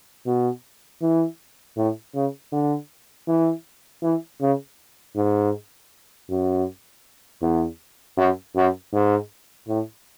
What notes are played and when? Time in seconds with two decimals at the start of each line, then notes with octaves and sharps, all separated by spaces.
0.26 B2
1.02 E3
1.77 A2
2.15 C#3
2.52 D3
3.28 E3
4.03 E3
4.41 C#3
5.16 G#2
6.29 F#2
7.41 E2
8.17 F#2
8.56 F#2
8.93 G#2
9.68 A2